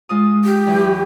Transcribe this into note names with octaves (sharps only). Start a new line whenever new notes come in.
G#3 F4 D#6
G4
E2 E3 F#3